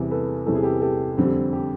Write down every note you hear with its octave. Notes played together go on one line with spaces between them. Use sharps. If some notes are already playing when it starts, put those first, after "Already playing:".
Already playing: E2 C3 E3 G3
A4 B4
E2 C3 E3 G3 A4
G#4
G4 A4
G4 A4
F2 D3 G3 C4
G4